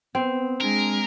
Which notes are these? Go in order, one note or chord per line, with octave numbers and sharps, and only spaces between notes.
B3 C4
G#3 D4 G#4 A#4